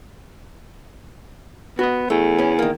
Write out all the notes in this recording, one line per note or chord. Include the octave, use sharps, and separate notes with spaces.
B3 F#4 D#5
E2 A3
B3 C#4
D#3 A#3